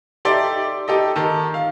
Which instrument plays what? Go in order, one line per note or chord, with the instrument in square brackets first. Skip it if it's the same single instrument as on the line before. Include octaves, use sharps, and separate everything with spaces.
[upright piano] D#4 G4 A4 D5 E5 C6
D#4 G4 A4 D#5
D#3 A5
F5